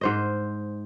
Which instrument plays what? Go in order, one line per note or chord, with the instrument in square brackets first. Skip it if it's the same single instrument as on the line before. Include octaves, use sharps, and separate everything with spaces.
[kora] G#2 C5 D#5